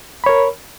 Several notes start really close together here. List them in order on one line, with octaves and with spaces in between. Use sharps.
B5 C#5 A#4